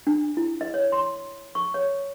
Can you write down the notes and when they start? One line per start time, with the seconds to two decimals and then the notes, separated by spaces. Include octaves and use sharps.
0.07 D4
0.37 E4
0.61 D#5
0.74 C#5
0.92 C6
1.55 C#6
1.74 C#5